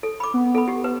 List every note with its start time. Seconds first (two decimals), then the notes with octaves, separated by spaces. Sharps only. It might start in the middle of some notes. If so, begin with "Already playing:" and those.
0.03 A4
0.20 B5 D6
0.34 B3
0.55 A4 B5
0.68 G4
0.84 B4